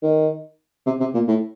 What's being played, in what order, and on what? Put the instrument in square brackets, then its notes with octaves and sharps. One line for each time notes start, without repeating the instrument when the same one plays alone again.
[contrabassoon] D#3
C3
C3
A#2
A2